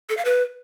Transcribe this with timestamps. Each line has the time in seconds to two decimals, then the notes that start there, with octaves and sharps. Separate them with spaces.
0.09 A4
0.17 F5
0.25 B4